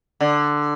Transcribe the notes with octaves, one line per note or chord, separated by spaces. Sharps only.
D3